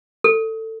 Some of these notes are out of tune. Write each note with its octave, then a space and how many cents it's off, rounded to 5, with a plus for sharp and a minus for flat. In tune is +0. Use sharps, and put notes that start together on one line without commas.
A4 +20